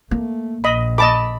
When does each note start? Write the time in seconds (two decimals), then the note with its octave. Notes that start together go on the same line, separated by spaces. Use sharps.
0.11 A3 A#3
0.64 A#1 D#5 B5
0.98 D#5 A5 B5 D6